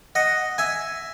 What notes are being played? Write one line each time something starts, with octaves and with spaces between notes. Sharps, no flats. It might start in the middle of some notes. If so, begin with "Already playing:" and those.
D#5 F#5
E5 G#5